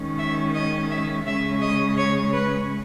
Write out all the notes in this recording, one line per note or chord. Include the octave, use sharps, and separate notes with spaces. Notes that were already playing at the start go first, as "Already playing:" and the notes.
Already playing: D#3 G#3 C#4
E5
D#5
E5
C#3 G#3 C#4 E5
D#5
C#5
B4